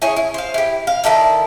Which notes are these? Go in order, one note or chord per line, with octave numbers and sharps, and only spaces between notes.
E4 G#4 C#5
E4
C5 F5
E4 G4
F5
D#3 E4 A4 D5